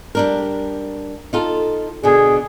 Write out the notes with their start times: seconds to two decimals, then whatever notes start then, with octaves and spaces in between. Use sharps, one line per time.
0.15 G3 D4 A#4
1.33 D#4 F4 A4
2.03 B2 D3 G#4